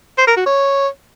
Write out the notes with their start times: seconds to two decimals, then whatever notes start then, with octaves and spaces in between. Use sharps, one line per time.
0.18 C5
0.27 A#4
0.37 F#4
0.46 C#5